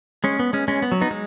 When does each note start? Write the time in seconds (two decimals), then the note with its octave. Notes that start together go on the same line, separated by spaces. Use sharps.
0.24 G#3 C#4
0.39 B3
0.53 G#3 C#4
0.68 G#3 C#4
0.82 B3
0.92 F#3
1.01 B3 D#4
1.11 G#3